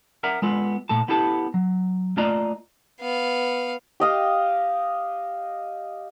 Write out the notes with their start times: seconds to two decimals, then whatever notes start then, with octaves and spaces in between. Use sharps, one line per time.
0.23 A#4 E5 F#5 A#5
0.42 G#3 B3 F4 A4
0.89 A#2 A3 A4 A5
1.08 B3 E4 G4 A4 A5
1.54 F#3
2.17 A3 A#3 F4 D5 D#5 A#5
3.00 B3 F5
4.00 G4 D#5 F5